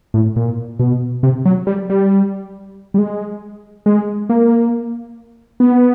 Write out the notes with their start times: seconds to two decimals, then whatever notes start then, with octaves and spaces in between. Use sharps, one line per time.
0.14 A2
0.36 A#2
0.79 B2
1.23 C3
1.45 F#3
1.67 G3
1.90 G3
2.94 G3
2.98 G#3
3.86 G#3
4.30 A#3
5.60 B3